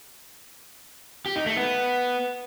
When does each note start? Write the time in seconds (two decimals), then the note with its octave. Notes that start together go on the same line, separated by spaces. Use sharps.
1.26 G4
1.36 D#4
1.46 A3
1.56 B3